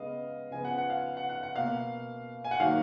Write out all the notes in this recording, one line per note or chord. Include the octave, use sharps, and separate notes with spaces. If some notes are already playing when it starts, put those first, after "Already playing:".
Already playing: C#3 G#3 B3 D#5 F5
C#3 F3 B3 G#5
F#5
F#5
F5
F#5
F#5
F#5
B2 A#3 F5
G#5
F#5
D#3 F#3 A#3 F5